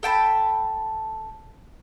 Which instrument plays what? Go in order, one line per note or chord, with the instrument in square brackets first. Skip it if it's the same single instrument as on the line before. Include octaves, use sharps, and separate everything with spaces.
[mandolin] A4 G5 A5 B5